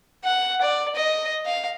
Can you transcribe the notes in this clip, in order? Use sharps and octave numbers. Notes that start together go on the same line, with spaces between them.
F#5
D5
D#5
F5